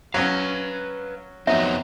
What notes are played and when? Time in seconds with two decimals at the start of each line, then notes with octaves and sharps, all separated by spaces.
0.14 F#3 C#4 B4 F5
1.47 F2 F#3 B3 C4 D#4 E5 A#5